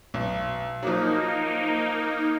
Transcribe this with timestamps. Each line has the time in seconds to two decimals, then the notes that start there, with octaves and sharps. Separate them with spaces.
0.14 B1
0.83 F3 F#3 A#3 D#4